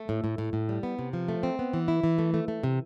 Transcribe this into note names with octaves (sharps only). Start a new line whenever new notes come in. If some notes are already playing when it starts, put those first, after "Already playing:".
Already playing: A3
A2
A2
A2
A2
G3
B3
C3
F3
A3
C4
B3
E3
E4
E3
A3
A3
A3
C3